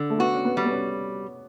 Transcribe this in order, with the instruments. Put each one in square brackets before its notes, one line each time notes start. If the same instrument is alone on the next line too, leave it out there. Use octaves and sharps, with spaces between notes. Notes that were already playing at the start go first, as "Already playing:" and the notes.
Already playing: [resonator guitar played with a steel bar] D3
[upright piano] A3
[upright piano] B3 [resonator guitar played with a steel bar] F#4
[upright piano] C#4
B3
[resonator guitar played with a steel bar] G3
[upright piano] B3
C#4